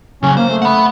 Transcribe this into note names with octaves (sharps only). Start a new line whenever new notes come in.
C#3 F#3 C#4
A#3 C5
A3
F#5 B5